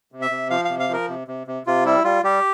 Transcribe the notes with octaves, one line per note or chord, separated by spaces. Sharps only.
C3
E5
C3
F3 F5
C3 F5
F5
F3 A#4
C3
C3
C3
C3 F4
G3 E4
G3 F4
G3 G4